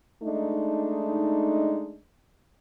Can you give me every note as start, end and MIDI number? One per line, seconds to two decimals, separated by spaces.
0.23 1.99 56
0.23 1.99 57
0.23 1.99 62
0.23 1.99 63